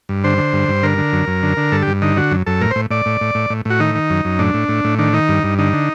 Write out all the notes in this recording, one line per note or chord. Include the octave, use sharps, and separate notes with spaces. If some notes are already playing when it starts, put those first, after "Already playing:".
G2
D3 C5
D3
G2
G2
D3 A#4
D3
F#2
F#2
D3
D3
G2 A4
G2 G4
D3 D#4
D3 F#4
F#2
F#2 A4
A2 A#4
C5
A2
A2 D5
A2
A2
A2
A2
A2 F#4
D#3 D#4
D#3
F#2
F#2
A2 D4
A2
A2
A2
D#3 D4
D#3 D#4
G2
G2
D3 D#4
D3